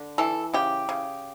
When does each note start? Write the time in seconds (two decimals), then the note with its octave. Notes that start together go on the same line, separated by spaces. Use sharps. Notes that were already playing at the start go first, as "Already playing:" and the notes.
Already playing: D3
0.18 E3 A4
0.54 C#3 G4
0.89 C#3